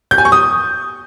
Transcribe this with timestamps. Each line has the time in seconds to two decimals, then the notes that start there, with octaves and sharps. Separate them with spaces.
0.11 G6
0.18 G#5
0.25 C#6
0.32 D#6